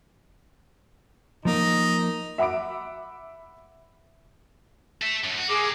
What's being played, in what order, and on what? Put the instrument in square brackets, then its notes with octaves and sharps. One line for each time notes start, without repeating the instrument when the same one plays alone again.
[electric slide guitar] F3 A#3 A#4 [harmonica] D#4
[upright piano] E5 F#5 B5 D6 D7
[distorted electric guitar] A4 E5
F#2 A2
F#4
[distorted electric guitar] C3 A#3 [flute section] G#4 G#5 D6